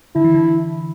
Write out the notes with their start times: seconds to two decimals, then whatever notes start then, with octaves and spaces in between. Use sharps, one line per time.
0.15 D3 E4
0.24 E3
0.34 D3